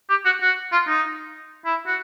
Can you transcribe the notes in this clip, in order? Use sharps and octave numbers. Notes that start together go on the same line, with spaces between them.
G4
F#4
F#4
F4
D#4
E4
F#4